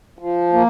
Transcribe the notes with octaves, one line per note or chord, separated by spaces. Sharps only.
F3
A#3